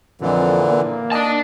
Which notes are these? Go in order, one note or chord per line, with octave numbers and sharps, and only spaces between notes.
F2 A#2 D3 E3
A#3
D5 D#5 A5